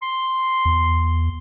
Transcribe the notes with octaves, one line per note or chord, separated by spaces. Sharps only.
C6
E2